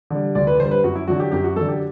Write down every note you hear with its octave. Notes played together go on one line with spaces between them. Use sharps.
D3 G3
D2 D5
B4
D3 G3 C5
B4
F#2 F#4
E4
D3 F#3 F#4
G4
F#2 G4
F#4
D3 F#3 A4
G4